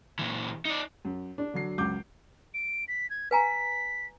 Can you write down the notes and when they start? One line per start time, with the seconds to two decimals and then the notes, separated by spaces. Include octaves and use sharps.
0.19 A#2 E3
0.65 D#4 D5
1.05 F#2
1.38 D4
1.54 D3 F#3 C7
1.78 C#2 F#2 D6 G6
2.54 D7
2.88 B6
3.10 G#6
3.31 B4 G#5 A#5 B6